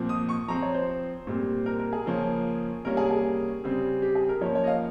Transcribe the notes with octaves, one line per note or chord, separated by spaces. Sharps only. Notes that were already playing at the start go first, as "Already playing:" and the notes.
Already playing: A#2 F3 C4
D#6
C#6
F3 C4 A#5
C#5
C5
A#2 G3 C4
A#4
A#4
G#4
C#3 F3 A#3 C#4
C3 G3 A#3 C#4 A#4
G#4
G#4
C#3 G3 C4
G4
G#4
A#4
F3 A#3 C#4 C#5
C#5
D#5
F5